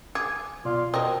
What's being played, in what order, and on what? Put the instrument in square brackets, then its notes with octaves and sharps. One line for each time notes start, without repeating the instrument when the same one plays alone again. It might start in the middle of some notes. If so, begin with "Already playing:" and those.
[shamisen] G#4 [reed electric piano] D6
[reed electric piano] B2 D5 [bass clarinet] F4
[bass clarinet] B2 [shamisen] A#4 D#5 [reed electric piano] C5 G5